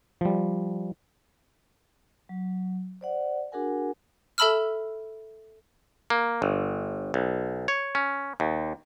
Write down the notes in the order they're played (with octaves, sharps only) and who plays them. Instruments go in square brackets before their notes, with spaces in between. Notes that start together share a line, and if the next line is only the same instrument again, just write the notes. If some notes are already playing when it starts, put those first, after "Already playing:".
[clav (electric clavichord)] F3 G3
[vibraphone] F#3
C5 D5 F#5
D4 F#4 G#4 A#4 F#5 G#5
[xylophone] A4 E5 A5 B5 E6 F6
[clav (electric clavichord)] A#3
G1
B1
C#5
C#4
D#2